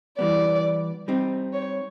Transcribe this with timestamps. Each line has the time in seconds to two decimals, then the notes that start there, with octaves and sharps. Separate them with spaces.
0.19 E3 G3 B3 D5
1.08 G3 C4 D#4
1.53 C#5